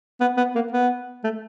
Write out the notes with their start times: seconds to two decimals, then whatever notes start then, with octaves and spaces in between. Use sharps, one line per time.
0.20 B3
0.37 B3
0.55 A#3
0.72 B3
1.24 A3